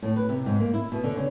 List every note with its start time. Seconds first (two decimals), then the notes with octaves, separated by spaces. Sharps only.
0.02 A2
0.16 B4
0.29 C3
0.46 G#2
0.60 A#3
0.74 E4
0.92 B2
1.04 D3
1.16 C#3